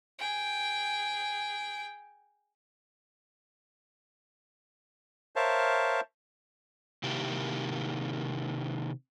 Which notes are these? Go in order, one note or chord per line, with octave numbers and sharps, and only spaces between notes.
G#4 G5
A#4 C5 C#5 E5 F5 A5
C3 D#3 A#3 E4 G4